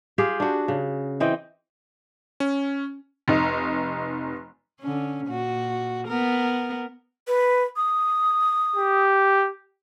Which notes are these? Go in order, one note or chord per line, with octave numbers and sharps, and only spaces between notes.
F4 G4 G#4
D4 F#4
C#3
E3 C4 D#5 G5
C#4
F1 D#4
D3 C#4
A#2 F#4
B3 A#4
B4
D#6
G4